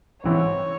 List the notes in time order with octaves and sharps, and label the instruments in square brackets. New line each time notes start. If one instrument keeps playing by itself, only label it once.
[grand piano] G#2 E3 G#3 C4 E4 [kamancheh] C#5